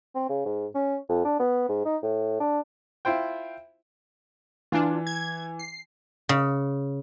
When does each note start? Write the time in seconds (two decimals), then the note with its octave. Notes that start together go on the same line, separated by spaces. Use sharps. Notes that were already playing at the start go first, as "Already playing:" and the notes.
0.15 C4
0.29 C#3
0.45 G#2
0.75 C#4
1.09 F2
1.25 D4
1.39 B3
1.69 G#2
1.85 D#4
2.03 A2
2.40 D4
3.05 E4 F4 C5 G5
4.72 E3 D4 F4
5.07 G#6
5.59 C7
6.29 C#3